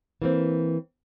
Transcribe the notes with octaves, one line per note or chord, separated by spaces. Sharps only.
E3 A#3 C4